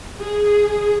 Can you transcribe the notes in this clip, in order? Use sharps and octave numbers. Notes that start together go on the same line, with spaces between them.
G#4